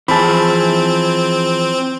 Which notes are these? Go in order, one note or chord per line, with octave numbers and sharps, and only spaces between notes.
E3 F3 C4 G#4 A5 B5